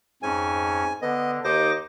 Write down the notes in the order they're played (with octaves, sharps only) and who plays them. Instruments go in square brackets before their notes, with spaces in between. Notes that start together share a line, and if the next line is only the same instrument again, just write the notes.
[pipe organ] F2 C#4 [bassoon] G#2 [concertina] G#5
[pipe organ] D3 [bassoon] B3 [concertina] D#5
[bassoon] D#2 [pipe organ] D#4 D6 A#6 [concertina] C5 D#5